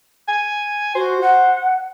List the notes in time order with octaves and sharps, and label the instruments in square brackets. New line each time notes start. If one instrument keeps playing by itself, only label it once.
[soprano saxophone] G#5
[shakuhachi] F#4 [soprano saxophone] C5
[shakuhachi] F#5